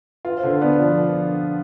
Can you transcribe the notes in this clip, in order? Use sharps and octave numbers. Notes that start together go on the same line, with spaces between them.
F4 B4
C5
D3
B3 D5
B4
F3